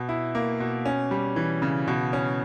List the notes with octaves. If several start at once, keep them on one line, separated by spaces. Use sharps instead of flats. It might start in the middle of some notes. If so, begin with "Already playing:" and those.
Already playing: B2
E4
A#3
B2
C#4
G3
E3
C#3
B2
C#4